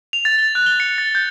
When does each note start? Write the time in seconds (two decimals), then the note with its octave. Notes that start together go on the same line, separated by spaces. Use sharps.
0.13 F7
0.25 A6
0.39 G7
0.55 F#6
0.66 G7
0.80 C#7
0.98 A6
1.15 G6